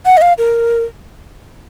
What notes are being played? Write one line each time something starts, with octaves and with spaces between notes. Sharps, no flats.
F#5
D#5
F5
A#4